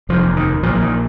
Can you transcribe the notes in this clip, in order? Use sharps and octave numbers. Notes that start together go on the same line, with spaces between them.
F1 D#2 F3
D#3
A#1 A#2 F3
F3
D#3